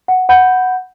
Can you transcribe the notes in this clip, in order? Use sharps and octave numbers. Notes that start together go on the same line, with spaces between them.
F#5
F#5 B5 G6